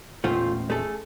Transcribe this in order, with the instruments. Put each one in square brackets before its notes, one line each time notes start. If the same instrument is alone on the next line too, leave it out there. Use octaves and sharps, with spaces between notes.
[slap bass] A1 E2 A#2 [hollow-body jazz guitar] A3 F4 C5
[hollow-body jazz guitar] A3 G#4 A4